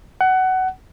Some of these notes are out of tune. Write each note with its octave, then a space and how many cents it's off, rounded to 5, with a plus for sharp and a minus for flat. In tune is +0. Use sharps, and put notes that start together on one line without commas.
F#5 +20